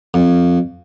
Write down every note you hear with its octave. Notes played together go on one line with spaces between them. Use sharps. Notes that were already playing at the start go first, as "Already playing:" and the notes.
F2